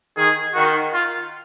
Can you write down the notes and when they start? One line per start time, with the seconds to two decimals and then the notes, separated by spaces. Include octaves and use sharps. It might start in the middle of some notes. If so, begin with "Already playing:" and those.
0.17 D#3 G#4
0.54 D#3 F#4
0.93 F4